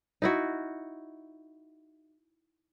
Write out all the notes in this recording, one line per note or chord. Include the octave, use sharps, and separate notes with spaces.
D#4 E4 F#4